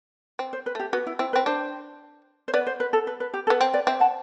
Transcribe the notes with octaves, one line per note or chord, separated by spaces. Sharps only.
C4
C5
B4
A3 G4
B3 F#4
E4
C4 E4
C4 B4
D4 C5
C5
B3 B4 D5
C5
B4
A4
B4
B4
G4
A4
B3
C4 C5
B4 D5
C4 C5 E5
F#5 A5